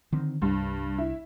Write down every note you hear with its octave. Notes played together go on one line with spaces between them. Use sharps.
D3 D#3 C4
C2 G2
E4